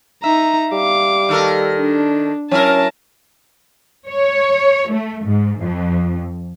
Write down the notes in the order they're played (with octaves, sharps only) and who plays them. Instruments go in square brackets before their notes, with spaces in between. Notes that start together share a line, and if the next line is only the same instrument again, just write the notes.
[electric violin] D#4 A#5 [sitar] E5
[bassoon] G3 [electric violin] F5 D6
[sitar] D#3 A4 A#4
[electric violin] D4
[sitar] F#3 E4 A#4 [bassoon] C#4 [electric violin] A5
[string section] C#5
A3
G#2
F2